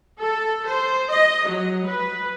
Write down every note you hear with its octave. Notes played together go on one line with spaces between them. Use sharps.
A4
C5
D#5
F#3
B4